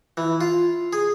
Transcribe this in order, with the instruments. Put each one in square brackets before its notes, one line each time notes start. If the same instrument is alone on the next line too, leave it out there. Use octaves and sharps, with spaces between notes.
[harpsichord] E3
F4
G#4